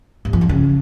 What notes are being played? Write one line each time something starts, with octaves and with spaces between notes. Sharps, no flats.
G2
F3
E2
C#3